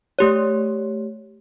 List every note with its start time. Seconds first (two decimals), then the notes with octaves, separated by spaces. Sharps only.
0.19 A3 G4 C#5